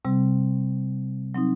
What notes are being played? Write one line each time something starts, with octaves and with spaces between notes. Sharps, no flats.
C3 G3 C4
F#3 C4 D#4